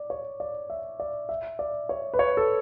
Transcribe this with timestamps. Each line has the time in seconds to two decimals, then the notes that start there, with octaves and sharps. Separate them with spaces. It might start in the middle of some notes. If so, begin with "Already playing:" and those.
Already playing: D5
0.10 C#5
0.40 D5
0.70 E5
1.00 D5
1.29 E5
1.59 D5
1.89 C#5
2.14 B4
2.19 C#5
2.37 A4